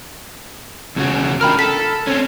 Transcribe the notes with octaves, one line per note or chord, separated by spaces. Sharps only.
E2 C#3 F#4
D4 F4 A#4 G5 B5 F6
A4 B6
C4 C#4